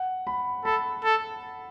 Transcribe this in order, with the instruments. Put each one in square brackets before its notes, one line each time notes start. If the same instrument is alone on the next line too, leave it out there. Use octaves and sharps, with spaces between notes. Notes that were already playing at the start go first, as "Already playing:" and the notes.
Already playing: [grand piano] F#5
B5
[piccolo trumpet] A4 [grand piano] B5
[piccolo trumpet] A4